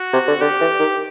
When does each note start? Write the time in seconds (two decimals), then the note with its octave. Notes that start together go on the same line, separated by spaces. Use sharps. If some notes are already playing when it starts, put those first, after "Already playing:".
Already playing: F#4
0.13 C3
0.28 D3
0.41 D3 G4
0.60 E3
0.79 D#3